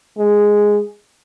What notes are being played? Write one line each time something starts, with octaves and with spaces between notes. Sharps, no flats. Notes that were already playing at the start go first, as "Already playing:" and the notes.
G#3